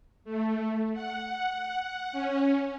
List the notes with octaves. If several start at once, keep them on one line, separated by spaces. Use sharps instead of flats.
A3
F#5
C#4